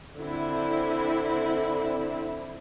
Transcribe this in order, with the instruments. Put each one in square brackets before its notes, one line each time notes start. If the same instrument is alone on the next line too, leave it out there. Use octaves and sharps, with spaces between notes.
[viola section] D3 C4 E4